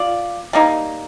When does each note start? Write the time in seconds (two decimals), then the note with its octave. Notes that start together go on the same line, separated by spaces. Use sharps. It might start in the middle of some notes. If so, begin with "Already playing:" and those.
Already playing: F4 D5
0.53 G3 A#3 D#4